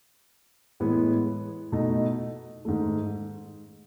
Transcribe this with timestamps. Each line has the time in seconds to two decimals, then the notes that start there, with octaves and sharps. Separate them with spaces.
0.80 A2 E3 G#3 B3
1.72 B2 A3 D#4
2.65 G#2 D#3 A3